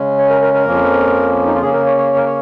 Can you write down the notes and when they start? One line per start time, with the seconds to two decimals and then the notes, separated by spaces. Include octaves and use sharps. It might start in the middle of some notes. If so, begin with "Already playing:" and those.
Already playing: C#3 G#3 C#4
0.18 C#5
0.30 A#4
0.42 A#4
0.54 A#4
0.66 F2 F3 A#3 C#4
1.47 D#4
1.55 F4
1.62 C#3 A#3 C#4 G#4
1.73 A#4
1.86 C#5
1.98 C#5
2.10 C#5
2.17 A#4
2.26 C#5